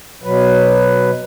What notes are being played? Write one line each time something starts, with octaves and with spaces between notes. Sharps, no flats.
B2 F#3 B4